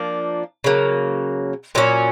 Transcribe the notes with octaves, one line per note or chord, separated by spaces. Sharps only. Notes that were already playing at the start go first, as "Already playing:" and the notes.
Already playing: F3 A#3 D4
C#3 F#3 A#3
A#2 F#3 A3 C#4